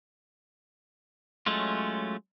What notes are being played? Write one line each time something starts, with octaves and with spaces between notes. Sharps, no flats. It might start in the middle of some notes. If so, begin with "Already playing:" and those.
F#3 G#3 A3 C#4 F4